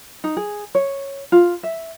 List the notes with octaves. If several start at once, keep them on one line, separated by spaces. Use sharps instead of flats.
D#4
G#4
C#5
F4
E5